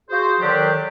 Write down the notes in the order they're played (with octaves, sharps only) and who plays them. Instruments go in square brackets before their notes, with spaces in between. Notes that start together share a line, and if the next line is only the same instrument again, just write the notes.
[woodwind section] F4 F#4 G#4 C5
D3 D#3 F#3 D4 G4